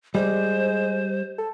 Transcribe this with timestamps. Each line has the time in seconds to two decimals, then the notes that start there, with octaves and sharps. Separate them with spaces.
0.15 G3 G#3 C5
1.38 A4